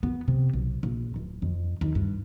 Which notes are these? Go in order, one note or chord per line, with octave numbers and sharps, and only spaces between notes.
B3
C3
B1
A#1
D1
F2
D#2
G2